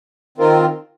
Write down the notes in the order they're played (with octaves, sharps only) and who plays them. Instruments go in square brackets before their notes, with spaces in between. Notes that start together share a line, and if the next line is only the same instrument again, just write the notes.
[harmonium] D#3 C4 F4 A#4